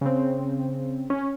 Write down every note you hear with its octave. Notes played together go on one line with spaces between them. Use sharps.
C#3 C4
C#4